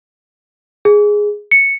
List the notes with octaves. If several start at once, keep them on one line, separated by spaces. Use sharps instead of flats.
G#4
C#7